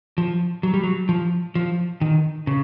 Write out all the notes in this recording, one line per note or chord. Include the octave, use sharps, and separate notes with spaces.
F3
F#3
G3
F#3
F3
F3
D#3
C#3